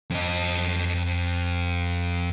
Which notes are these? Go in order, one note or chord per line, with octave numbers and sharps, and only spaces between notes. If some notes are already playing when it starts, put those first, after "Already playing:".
F2 D#5